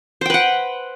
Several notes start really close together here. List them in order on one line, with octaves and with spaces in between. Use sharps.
C5 G5 B4 F#5